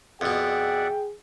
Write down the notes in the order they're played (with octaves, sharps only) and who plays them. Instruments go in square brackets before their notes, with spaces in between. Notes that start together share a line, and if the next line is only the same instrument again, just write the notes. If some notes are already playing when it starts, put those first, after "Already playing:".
[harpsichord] F2 B2 [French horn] G#4 [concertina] D5 E5 F#5 [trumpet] G5